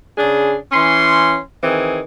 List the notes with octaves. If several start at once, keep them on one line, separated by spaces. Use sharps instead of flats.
C#3 D4 G#4
E3 C#4 C6
D#3 E3 C4 G#4